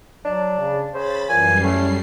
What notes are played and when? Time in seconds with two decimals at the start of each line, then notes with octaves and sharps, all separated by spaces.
0.25 F#3 D4
0.59 C#3
0.94 C#3 C5 B5 A6
1.29 F#2 A#2 E3 G3 G#5 C7
1.63 A2 A3 C#4